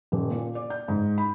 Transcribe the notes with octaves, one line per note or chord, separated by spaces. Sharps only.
D#1
A#2
D5
G6
G#2
B5